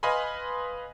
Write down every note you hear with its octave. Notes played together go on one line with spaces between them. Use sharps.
B4 D#5 F5 G#5 B5 C6